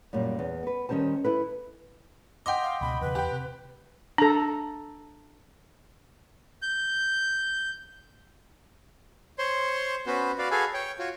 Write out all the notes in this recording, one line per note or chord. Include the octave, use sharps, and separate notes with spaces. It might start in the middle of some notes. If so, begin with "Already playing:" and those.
F#2 A#2 G3
E2
B3 B4
D#3 G3 C#4 C5 A5
E4 A4 B4
D#5 F#5 G5 C6 D6
F5
C#2 B2 B5
E2 C#3 B4
E2 G4 G5
C3
D4 A4 A#5
G6
C5 C#5 C6
B3 C#4 F#4 B4 C5
F#4 B4 D5 F5
F#4 G#4 A4 B4 F5 G#5
C#5 G5
F4 F#4 C#5